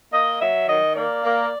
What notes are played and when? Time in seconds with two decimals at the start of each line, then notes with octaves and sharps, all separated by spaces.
0.13 A#3 D#5
0.41 F#3 E5
0.68 D#3 D#5
0.96 A#3 D5
1.24 A#3